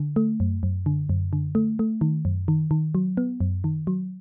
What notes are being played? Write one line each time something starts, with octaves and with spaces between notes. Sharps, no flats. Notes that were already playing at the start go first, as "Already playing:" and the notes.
Already playing: D3
A3
F#2
F#2
D3
F#2
D3
A3
A3
D#3
F#2
D#3
D#3
F#3
B3
F#2
D#3
F#3